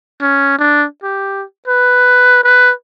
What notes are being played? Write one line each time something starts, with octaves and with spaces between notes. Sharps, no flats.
C#4
D4
G4
B4
B4